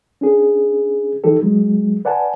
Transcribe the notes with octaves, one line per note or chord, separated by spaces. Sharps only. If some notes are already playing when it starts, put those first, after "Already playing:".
C#4 D4 G#4
D#3 E3 D#4 G4 A4
F#3 G#3
B4 D5 F#5 G#5 A5